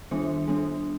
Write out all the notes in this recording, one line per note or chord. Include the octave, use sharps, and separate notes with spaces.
D#3 G3 B3 D4 C5
G3 B3 D4